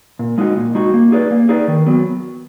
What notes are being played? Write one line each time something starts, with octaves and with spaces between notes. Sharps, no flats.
A#2
G#3 D#4 F#4
A#2
G#3 D#4 F#4
A#3
D#4 G#4 B4 D5
A#3
D#4 G#4 B4 D5
D#3
F#3 B3